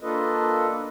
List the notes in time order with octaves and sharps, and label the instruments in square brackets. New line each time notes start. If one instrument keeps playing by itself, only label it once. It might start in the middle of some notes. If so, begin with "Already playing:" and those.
[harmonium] A#3 D4 F4 A4 B4 D#5